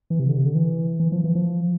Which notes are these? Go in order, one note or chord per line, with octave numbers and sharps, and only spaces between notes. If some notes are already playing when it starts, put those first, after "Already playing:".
E3
C3
D3
C3
D3
E3
E3
F3
E3
F3